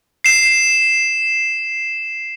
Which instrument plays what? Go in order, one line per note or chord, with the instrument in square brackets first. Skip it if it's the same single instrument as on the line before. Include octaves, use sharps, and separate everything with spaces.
[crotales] C7 E7